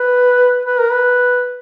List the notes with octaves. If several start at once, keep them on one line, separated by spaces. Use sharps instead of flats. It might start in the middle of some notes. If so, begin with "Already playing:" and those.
Already playing: B4
B4
A#4
B4